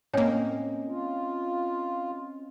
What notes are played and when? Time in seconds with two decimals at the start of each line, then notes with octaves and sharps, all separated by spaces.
0.13 A2 A#3 C4 C#4 C#5 D#5 G5 G#5
0.88 F4